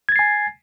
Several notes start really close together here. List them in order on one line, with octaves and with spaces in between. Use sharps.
G#6 A6 C7 G#5